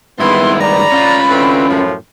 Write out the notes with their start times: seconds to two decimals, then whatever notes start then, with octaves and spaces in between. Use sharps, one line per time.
0.20 G2 D#3 G#3 B3 E4 C6
0.61 D5 A#5 B5
0.92 C#4 F4
1.29 D3 E3 C4
1.69 F#2 A2 F3